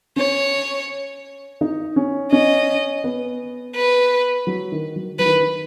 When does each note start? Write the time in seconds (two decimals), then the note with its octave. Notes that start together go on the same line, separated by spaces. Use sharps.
0.16 C#4 C#5
1.61 D#4
1.96 C#4
2.32 C#4 D#5
3.04 B3
3.75 B4
4.47 F#3
4.72 D#3
4.96 F#3
5.19 F#3 B4
5.26 D#3
5.40 D#3